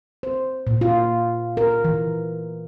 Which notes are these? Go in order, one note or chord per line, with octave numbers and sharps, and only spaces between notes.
C5
A#2
F4
A#4
E3